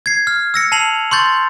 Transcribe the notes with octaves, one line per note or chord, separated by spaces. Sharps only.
G#6 C7
F6
E6 A#6 C#7
A5 C7 F7 F#7
C6 C#6 G6 A6